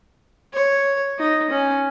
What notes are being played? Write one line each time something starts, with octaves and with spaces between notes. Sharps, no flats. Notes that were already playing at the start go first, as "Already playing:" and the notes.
C#5
D#4
C#4